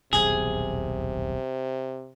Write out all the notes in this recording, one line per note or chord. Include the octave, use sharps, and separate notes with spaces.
D#1 B1 E2 C3 G#4